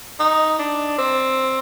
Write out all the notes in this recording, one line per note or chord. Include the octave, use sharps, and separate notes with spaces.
D#4
D4
C4